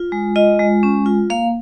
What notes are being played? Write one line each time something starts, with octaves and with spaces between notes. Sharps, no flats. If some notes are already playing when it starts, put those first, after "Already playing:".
Already playing: F4
G#3
F4 D#5
G#3
C#4
F4
A#3 F5